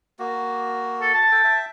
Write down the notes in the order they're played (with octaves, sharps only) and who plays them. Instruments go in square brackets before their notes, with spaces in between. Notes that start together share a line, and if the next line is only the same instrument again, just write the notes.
[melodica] A#3 F#4
[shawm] A4
A5
[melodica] A4 G5
E5 G5